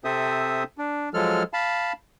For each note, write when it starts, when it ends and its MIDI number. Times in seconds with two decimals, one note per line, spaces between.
0.04 0.63 48
0.04 0.63 60
0.04 0.63 69
0.04 0.63 72
0.04 0.63 76
0.04 0.63 87
0.78 1.09 62
1.14 1.43 53
1.14 1.43 54
1.14 1.43 56
1.14 1.43 69
1.14 1.43 89
1.53 1.93 77
1.53 1.93 81
1.53 1.93 83